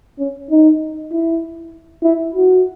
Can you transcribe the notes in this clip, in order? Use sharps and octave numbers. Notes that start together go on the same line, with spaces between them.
C#4
D#4
E4
E4
F#4